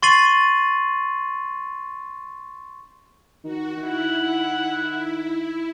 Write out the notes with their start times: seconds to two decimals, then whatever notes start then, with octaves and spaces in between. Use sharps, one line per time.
0.02 C6 C#6 A6 C7 D#7 F#7
3.44 D#3 F#4
3.77 D#3 E4 F#5